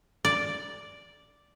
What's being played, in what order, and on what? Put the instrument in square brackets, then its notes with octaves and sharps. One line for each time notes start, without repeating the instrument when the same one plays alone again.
[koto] D5